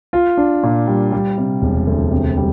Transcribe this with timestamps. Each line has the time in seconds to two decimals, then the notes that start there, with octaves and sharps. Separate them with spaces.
0.13 F4
0.37 D4
0.63 A#2
0.87 G3
1.12 G3
1.38 C3
1.62 E1
1.87 D2
2.11 C3
2.37 G3